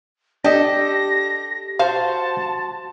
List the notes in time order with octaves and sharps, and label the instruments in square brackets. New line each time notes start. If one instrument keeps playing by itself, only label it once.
[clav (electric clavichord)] D4 D#5 [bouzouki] G4 A4 [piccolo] A#6
[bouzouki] F#4 C5 [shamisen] F5 [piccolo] A5